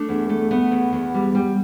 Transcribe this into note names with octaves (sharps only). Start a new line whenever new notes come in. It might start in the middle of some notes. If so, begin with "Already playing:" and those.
Already playing: A3 D4
E2
A3
A3 B3
E2
E2
G3
G3